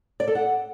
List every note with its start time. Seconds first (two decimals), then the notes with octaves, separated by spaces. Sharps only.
0.20 D5
0.28 A4
0.35 F#5